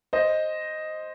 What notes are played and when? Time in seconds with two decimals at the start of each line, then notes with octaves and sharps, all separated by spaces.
0.13 C5 D#5